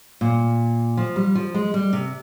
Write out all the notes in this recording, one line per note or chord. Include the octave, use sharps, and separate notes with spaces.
A#2
F3
G3
F3
G#3
G3
C3